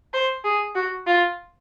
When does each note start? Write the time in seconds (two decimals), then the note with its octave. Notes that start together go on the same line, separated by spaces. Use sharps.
0.14 C5
0.44 G#4
0.75 F#4
1.07 F4